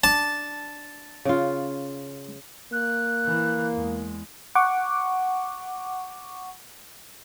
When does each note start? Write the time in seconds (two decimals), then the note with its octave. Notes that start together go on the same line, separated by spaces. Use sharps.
0.04 D4 A5
1.25 C#3 F4
2.73 A#3 F#6
3.26 E3
3.73 E2 G#3
4.55 F#5 C#6 D6